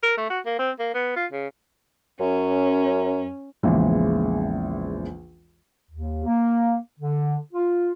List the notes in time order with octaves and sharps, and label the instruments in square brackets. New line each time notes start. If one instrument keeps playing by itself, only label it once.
[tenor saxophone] A#4
A3
F#4
A#3
C4
A#3
B3
F4
C#3
[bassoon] F#2 [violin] C#4
[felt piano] A#1 E2 C#3 E3 G#3
[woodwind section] D#2
A#3
D3
F4